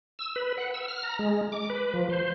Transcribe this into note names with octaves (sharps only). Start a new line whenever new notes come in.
E6
B4
F#5
E6
F6
A#5
G#3
D6
B4
F3
C5